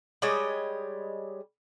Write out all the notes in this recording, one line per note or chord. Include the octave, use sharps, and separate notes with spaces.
G3 G#3 C#5 D#5